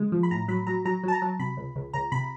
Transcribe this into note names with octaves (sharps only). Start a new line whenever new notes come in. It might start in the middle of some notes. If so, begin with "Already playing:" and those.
Already playing: C#3 G#3
F3
B5
A2 A#5
F#3 B5
F#3 A#5
F#3 A#5
F#3 A5
A#5
F#3
C3 B5
C#2
C#2
C#2 A#5
C3 B5